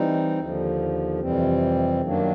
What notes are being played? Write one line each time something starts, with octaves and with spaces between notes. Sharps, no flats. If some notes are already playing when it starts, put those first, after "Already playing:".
Already playing: E3 G3 C4 D#4
D#2 D3 F3
F2 C3 E3 G3 C4
F#2 D#3 F#3 A#3 D4